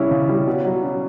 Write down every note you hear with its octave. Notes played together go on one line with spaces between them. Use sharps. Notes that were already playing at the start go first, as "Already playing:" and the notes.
Already playing: C#3 G3 C#4 E4
C#3
G3
B2
F#3
C#4